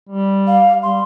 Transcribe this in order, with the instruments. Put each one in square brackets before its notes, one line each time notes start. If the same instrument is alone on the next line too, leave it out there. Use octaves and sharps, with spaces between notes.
[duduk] G3
[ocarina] F5
[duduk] G3 [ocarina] C6